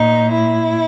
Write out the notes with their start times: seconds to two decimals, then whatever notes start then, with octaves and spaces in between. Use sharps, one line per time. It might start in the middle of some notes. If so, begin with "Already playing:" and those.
Already playing: A#2 D#4
0.30 E4